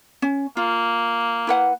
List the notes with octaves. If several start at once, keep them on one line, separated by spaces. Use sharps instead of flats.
C#4
A#3 F4
E4 B4 F#5